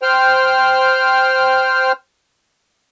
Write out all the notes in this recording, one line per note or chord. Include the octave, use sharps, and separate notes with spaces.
C5 G5 F6